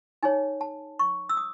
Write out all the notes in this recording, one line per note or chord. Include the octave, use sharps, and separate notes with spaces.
D#4 G#4 C#5 G#5
A5
C#6
E6
D#6